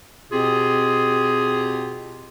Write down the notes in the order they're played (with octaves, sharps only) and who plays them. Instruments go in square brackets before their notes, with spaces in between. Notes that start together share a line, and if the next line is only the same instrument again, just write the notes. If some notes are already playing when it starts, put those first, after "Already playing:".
[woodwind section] B2 C4 F4 G4 G#4